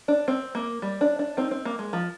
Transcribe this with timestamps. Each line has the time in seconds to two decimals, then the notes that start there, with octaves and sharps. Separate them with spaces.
0.08 D4
0.28 C4
0.55 A#3
0.82 G3
1.01 D4
1.19 D4
1.37 C4 D#4
1.51 C4
1.65 A#3
1.79 G#3
1.93 F3